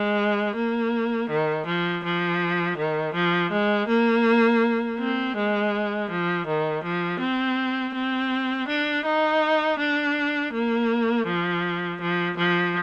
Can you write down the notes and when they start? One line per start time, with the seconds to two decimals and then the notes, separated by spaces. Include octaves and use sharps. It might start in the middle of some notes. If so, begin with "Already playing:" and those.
Already playing: G#3
0.56 A#3
1.30 D#3
1.66 F3
2.04 F3
2.78 D#3
3.14 F3
3.52 G#3
3.88 A#3
4.99 C4
5.37 G#3
6.10 F3
6.47 D#3
6.84 F3
7.21 C4
7.95 C4
8.68 D4
9.06 D#4
9.79 D4
10.53 A#3
11.27 F3
12.01 F3
12.37 F3